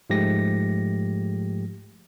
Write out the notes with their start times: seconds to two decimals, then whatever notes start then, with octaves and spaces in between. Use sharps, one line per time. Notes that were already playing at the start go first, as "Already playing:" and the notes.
0.10 G#2 F3 G#3 A3 G4 A#6